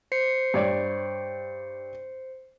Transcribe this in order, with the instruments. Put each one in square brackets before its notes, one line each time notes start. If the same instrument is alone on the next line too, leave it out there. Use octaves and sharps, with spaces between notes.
[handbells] C5 C7 C#7
[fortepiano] G2 C#5 D5